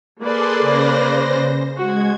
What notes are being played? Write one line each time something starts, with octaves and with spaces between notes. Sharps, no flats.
A#3 G#4 A4 B4 D5 C6
C#3 C5 A#6
G#3 F#4 G#6